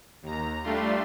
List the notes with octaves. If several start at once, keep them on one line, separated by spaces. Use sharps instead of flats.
D#2 A#5
G3 A3 D4 F4 C6